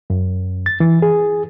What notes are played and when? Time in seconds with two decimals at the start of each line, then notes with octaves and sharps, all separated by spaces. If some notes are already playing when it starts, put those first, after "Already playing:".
0.10 F#2
0.66 A6
0.80 E3
1.02 G#4